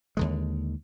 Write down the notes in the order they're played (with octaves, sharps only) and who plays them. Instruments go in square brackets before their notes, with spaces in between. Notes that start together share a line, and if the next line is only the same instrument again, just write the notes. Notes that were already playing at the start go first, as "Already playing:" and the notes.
[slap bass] D#2 D3 G#3